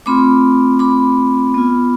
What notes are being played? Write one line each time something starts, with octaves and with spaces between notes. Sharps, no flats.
A3 C4 F4 B5 D6
B5 D6
B3 F4